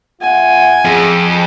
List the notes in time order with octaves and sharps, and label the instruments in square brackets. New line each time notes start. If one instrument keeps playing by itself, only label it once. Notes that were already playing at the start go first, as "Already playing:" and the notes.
[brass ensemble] F4 E5 F#5 [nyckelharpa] G#5
[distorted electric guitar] F2 [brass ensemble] G#4